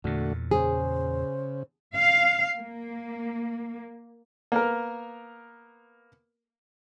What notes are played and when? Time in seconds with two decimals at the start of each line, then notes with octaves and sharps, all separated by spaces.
0.04 E2 A#2 D3 A3 F#4
0.51 C#3 G#4 C5
1.94 F5
2.55 A#3
4.52 A#3 B3 A#4